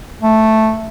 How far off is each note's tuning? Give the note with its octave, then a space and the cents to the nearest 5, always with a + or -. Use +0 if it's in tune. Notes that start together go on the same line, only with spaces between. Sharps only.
A3 +0